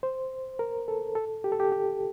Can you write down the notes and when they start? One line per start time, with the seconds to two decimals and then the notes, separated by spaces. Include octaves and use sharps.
0.03 C5
0.59 A#4
0.88 A4
1.15 A4
1.44 G4
1.52 A4
1.60 G4
1.72 G4